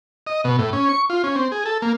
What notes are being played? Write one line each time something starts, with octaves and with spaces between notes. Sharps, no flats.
D#5
B2
A2
C#4
C#6
F4
C#4
C4
G#4
A4
A#3